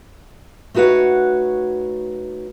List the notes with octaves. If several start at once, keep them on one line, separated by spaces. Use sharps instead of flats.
A3 D#4 F#4 B4 C#5 F#5